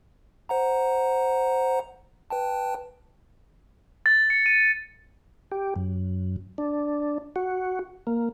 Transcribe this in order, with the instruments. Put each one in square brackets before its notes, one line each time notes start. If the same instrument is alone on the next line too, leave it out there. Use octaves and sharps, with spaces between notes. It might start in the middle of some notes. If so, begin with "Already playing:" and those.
[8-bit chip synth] C5 F#5 A#5
B4 G5 A5
[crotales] A6
C#7
D#7
[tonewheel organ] G4
F#2
D4
F#4
A#3